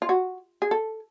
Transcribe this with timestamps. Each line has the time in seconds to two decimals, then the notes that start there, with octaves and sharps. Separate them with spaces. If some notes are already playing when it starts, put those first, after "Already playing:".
0.02 F4
0.09 F#4
0.62 G#4
0.71 A4